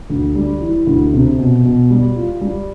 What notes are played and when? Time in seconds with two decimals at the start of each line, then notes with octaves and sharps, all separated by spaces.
0.10 D2
0.35 G3
0.61 E3
0.87 D2
1.14 C3
1.39 B2
1.65 B2
1.91 G3
2.17 F4
2.41 G3